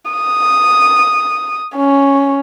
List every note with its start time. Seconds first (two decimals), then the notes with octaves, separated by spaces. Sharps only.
0.11 D#6
1.76 C#4